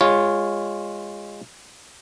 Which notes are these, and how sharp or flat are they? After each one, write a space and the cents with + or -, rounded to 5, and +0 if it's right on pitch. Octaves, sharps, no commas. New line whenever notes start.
G#3 -20 F4 +0 C#5 -10